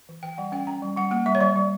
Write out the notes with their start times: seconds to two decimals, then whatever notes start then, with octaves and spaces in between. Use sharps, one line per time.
0.09 E3
0.23 E3 G5
0.38 G3 F#5
0.52 C#4 G5
0.67 C#4 A#5
0.82 G3
0.97 G3 F#5
1.11 A#3 F#5
1.26 G3 E5
1.35 C#5
1.41 G3 D5
1.56 G3